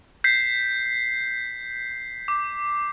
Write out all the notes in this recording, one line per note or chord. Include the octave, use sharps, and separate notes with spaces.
G6 B6 C7
D6